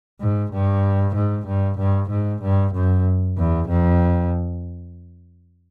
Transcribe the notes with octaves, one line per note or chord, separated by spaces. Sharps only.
G#2
G2
G#2
G2
G2
G#2
G2
F#2
E2
F2